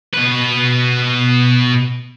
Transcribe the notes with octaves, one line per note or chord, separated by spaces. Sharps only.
B2 B4